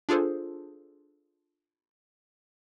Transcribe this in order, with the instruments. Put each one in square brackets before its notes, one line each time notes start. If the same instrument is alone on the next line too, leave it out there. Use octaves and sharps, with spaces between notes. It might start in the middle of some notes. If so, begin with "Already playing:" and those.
[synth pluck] D4 F4 G#4 A4 C5